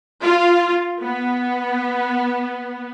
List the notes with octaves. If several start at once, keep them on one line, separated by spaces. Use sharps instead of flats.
F4
B3